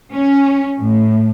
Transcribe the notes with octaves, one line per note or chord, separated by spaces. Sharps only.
C#4
A2